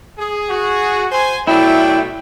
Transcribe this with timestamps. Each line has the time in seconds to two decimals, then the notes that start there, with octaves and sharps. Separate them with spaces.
0.19 G#4
0.49 F#4
1.12 C5 G#5
1.47 B2 F#3 A3 E4 D5 E5 G5